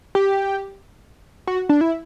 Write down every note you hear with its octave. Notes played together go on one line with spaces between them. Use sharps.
G4
F#4
D4
E4